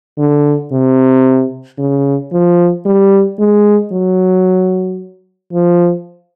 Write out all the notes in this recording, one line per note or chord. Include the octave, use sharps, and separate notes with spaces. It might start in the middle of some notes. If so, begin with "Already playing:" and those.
D3
C3
C#3
F3
G3
G#3
F#3
F3